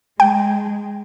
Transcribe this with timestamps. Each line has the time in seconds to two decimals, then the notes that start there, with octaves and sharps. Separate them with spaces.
0.20 G#3 G5